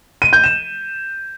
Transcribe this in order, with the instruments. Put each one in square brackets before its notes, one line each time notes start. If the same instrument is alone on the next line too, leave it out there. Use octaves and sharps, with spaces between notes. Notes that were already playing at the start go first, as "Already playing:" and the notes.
[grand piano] D#7
G6
E7